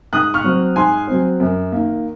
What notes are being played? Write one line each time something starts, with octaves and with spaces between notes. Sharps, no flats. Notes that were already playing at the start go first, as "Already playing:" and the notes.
G#2 D#6 F#6
C#6 F6
F#3 C4
G#2 G#5 C6
F#3 C4
F#2
D#3 A#3